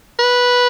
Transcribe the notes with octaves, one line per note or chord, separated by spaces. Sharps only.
B4